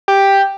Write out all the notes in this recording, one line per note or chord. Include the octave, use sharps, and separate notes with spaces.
G4